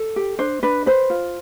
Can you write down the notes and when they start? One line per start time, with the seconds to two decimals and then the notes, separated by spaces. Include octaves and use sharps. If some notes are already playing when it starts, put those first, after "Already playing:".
Already playing: A4
0.16 G4
0.39 D4 C5
0.63 D4 B4
0.86 B4 C5
1.10 F4